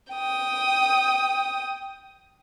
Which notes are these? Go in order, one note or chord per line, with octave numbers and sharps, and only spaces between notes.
G5 D#6